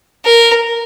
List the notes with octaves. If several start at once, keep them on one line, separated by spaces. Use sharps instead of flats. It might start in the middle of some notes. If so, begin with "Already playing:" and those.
A#4